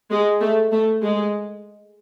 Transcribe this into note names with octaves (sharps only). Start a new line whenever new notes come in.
G#3
A3
A3
G#3